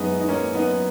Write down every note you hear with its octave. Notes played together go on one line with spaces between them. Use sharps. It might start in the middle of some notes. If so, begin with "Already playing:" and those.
Already playing: F#2 G#3 B3 C#4 D#4
D#4
A#3 C#4
B3 D#4